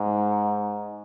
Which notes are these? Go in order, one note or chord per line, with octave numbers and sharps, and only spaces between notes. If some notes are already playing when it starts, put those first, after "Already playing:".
Already playing: G#2